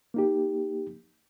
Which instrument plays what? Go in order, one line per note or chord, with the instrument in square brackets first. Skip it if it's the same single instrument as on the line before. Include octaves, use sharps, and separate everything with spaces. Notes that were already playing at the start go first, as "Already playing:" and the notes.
[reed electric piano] A#3 D#4 G4